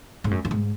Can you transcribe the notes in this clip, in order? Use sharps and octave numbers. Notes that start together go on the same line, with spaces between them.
G#2
F#2
F#2
G#2